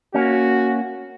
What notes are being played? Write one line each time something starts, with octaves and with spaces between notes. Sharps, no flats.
A#3 C#4 F#4